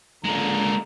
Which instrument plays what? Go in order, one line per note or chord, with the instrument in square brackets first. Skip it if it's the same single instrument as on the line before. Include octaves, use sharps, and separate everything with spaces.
[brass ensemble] C#2 D3 A#5 [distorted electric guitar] G#3 A#3